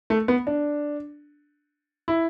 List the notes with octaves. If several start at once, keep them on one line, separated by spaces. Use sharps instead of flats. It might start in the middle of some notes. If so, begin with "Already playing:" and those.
A3
B3
D4
E4